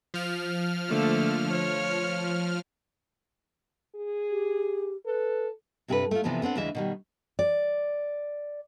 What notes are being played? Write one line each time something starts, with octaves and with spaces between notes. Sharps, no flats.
F3 F6
D3 A3 A#3
C#5
G#4
G4
A4 B4
G2 C3 F#4 G#4 A4 B4
A3 F4
C3 E3 F3 A3 B3 D4
B3 C4 D4 F#5
D2 C#3 E3 G#3 E5
B2 D#3 G3
D5